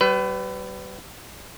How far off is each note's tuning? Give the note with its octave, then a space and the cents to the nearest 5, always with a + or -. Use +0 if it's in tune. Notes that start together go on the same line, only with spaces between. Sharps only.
G3 -40 B4 +25